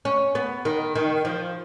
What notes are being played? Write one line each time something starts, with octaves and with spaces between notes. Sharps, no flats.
C#4
B3
D#3
D#3
F3